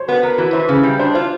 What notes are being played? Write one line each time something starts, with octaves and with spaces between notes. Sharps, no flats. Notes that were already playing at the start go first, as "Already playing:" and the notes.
Already playing: C5 C#5
B3 B4
B3 A#4
E3 B4
E3 C5
C#3
G3
D4 C5
F4 C5